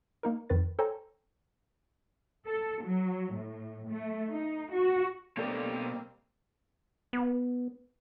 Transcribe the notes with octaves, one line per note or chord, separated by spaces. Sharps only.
A#3 D#4 A#4
F2 D#3 B4 A6
A4 C5 C#5 G5 G#5 A#5
A4
F#3
A2
A3
D#4
F#4
B2 G3 A3 A#3 C4 D4 A4 C#5
B3